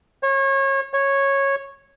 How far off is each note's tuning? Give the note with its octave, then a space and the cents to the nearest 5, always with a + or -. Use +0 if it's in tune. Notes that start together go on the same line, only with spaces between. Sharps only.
C#5 -30
C#5 -10